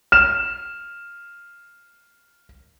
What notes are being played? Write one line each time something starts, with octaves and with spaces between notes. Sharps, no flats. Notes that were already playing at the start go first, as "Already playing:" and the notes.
F6 E7